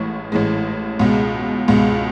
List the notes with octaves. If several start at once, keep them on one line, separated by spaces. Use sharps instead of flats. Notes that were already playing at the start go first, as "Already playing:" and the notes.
Already playing: A1 A2 E3 G#3 C#6
A1 A2 E3 G#3
C#2 B2 G#3
C#2 B2 G#3